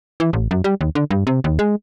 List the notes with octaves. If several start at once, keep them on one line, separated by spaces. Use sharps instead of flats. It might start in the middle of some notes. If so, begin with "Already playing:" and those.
E3
A1
F#2
G3
D#2
D3
G2
C3
D#2
G#3